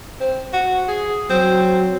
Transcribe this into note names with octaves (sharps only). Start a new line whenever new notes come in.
C4
F#4
G#4
F#3 C4